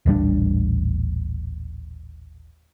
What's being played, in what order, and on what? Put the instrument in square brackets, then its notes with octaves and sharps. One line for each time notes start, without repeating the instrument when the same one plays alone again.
[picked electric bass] D#1 A1 G3 D4